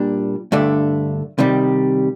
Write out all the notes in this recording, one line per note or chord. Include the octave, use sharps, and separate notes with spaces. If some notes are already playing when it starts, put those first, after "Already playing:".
Already playing: A#2 G3 D4
G2 D3 A3 D4
C3 D#3 G3